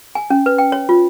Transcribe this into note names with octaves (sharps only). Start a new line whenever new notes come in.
G#5
C#4
B4
G5
C#5
F4